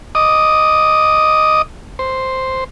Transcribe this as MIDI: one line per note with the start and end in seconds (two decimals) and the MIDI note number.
0.15 1.62 75
0.15 1.62 86
0.15 1.62 87
1.99 2.64 72